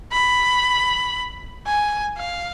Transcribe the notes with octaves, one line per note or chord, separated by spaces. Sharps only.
B5
G#5
F5